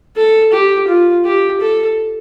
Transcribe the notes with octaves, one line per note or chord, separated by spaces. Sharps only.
A4
G4
F4
G4
A4